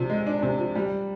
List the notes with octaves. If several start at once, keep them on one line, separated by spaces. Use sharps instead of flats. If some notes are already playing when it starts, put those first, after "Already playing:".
Already playing: C3 F3 D4
G#3
D4
C3
F3
G3